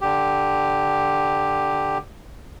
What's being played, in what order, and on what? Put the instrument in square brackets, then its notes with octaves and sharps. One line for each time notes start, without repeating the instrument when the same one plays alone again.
[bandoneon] D3 G4